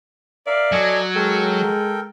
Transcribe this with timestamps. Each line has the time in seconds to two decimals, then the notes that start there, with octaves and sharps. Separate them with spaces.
0.47 A#4 D5 E5 F5
0.72 F#3 A4 D#5 G#5
1.15 G#3 A4 A#4 G5